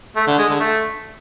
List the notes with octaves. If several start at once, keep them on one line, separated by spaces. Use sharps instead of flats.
A3
D3
G#3
D3
A3